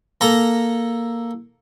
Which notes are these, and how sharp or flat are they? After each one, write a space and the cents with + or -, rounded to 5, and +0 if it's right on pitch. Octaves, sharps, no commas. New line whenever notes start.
A#3 +0 A4 +0 A#5 +0